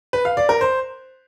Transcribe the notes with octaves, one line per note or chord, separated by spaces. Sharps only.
B4
F5
D5
A#4
C5